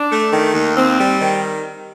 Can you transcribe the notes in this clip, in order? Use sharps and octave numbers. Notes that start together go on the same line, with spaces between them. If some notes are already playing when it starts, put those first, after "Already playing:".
Already playing: D4
A3
D#3
D#2
C4
G3
D#3